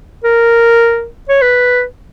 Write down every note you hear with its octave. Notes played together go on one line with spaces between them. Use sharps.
A#4
C#5
B4